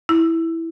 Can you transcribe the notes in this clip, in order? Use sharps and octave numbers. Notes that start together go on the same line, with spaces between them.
E4